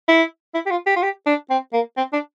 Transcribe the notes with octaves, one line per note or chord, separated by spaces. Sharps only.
E4
E4
G4
F4
G4
F4
G4
D4
C4
A#3
C4
D4